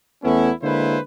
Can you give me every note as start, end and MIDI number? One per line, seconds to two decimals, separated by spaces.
0.24 0.51 40
0.24 0.51 57
0.24 0.51 59
0.24 0.51 61
0.24 0.51 64
0.63 0.98 50
0.63 0.98 56
0.63 0.98 58
0.63 0.98 64
0.63 0.98 71
0.63 0.98 72